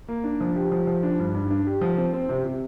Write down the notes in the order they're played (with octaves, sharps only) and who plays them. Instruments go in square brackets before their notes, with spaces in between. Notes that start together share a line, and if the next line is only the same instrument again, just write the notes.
[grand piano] A#3
D4
F3
G4
F3
F3
D4
G2
G2
D4
G4
F3
C4
C4
C3
C3